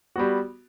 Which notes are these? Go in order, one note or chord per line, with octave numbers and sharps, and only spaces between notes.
G3 B3 F#4